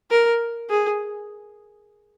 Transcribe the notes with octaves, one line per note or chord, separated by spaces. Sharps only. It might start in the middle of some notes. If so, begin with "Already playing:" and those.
A#4
G#4